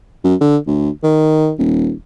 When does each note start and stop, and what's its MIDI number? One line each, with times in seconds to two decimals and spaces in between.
0.24 0.35 42
0.41 0.57 50
0.67 0.90 38
1.03 1.52 51
1.58 1.92 27